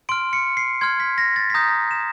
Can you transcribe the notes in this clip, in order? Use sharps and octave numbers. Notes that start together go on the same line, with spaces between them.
C6 F6 D7
C#7
C7
C6 F6 G#6
B6
A#6
A6
B6
A#5 D#6 G6 A#6
E7